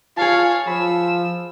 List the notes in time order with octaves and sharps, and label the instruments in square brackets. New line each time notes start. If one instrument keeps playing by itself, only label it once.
[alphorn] F4 [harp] G#4 A5 [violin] C#5 F5
[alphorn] F3 [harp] B5 [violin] E6